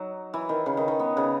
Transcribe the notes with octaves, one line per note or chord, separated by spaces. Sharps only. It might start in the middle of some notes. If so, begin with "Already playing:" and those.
Already playing: F#3 D#4
E3
D#3
C#3
D#3
D#3
B3
C#3